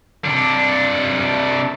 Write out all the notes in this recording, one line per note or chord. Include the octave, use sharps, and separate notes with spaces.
C3 D4